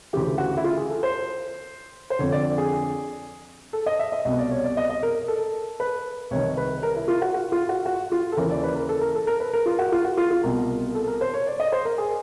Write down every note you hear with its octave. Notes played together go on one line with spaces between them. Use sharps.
D2 C#3 E3 G4
F#4
E4
F4
G#4
A4
C5
C5
F2 D3 C#5
D5
G#4
A4
D#5
E5
D#5
C2 B2 D#5
D5
C#5
D5
D#5
D#5
A#4
A4
B4
C2 C3 D#3 C#5
B4
A#4
E4
F4
F#4
F#4
F4
F#4
F#4
F4
A4
D#2 C#3 E3 A#4
D5
B4
A#4
A4
A#4
A4
A#4
B4
A#4
F4
F#4
F4
F#4
F4
F4
C2 B2 A#4
A4
A#4
C5
C#5
D5
D#5
C5
A#4
G#4